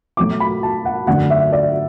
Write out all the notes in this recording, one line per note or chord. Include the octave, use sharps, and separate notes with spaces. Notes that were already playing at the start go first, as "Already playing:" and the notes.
B2 F#3 A3 D6
B5
A5
F#5
F#2 D3 A3 F#5
E5
D5